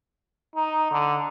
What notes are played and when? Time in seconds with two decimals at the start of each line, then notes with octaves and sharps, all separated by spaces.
0.56 D#4
0.91 D3